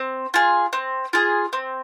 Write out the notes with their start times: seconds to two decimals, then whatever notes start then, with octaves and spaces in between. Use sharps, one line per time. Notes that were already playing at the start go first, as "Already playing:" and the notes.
Already playing: C4
0.34 F4 G#4
0.73 C4
1.13 F4 G#4
1.53 C4